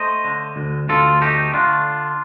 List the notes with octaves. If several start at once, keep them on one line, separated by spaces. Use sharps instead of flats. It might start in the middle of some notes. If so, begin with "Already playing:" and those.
Already playing: A3 C5 D#5
D3
D2
D2 F4 A4
A3 D#4 G4
D3 D4 F4